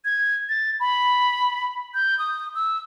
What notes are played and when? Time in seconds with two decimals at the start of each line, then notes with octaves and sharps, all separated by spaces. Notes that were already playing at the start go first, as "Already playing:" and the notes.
0.05 G#6
0.49 A6
0.80 B5
1.94 G6
2.19 D#6
2.55 E6